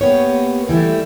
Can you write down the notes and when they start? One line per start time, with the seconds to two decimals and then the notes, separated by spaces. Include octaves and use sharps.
0.01 A#3 B3 G4 C#5
0.69 E3 G3 A3 E4